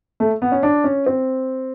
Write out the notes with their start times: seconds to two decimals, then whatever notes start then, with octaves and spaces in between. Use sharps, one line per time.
0.20 A3
0.42 B3
0.52 C#4
0.63 D4
0.84 C#4
1.06 C4